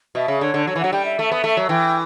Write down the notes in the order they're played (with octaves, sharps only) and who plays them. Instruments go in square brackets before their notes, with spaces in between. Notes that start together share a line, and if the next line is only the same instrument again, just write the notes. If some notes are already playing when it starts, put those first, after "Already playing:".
[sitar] B2 [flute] E5
[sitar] C#3
[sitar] D3 [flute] C#5
[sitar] D3
[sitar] F#3 [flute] C#5
[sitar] E3
[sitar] F#3 [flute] F#5
[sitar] G3 [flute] G5
[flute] E5
[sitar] A3
B3
A3
F#3
[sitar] E3 [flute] G5